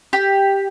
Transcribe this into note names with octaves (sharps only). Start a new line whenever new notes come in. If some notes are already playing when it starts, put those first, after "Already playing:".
G4